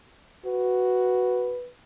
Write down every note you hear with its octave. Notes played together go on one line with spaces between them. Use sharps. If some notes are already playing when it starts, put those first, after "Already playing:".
F#4 B4